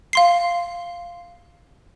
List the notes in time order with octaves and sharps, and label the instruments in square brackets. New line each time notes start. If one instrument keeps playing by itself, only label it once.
[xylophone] F5 C6 C7